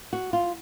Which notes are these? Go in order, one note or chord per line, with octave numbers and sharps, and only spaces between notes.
F#4
F4